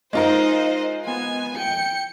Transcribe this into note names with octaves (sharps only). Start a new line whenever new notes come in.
G#3 D#4 F4 A#4 C5 D#5
B3 G#5
G5 C#7